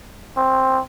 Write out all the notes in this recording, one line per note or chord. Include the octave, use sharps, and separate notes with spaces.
C4